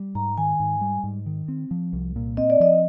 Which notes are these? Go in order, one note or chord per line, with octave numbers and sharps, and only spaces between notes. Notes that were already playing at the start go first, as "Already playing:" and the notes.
Already playing: G3
G#2 A#5
D#3 G#5
G#2
G3
G#2
D#3
C4
F3
C2
A#2
C4 D#5
D5
F3 D#5